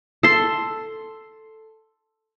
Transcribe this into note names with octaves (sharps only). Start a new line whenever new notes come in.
A4 C6